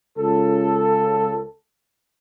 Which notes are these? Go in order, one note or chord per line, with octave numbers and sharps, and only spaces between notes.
C#2 A4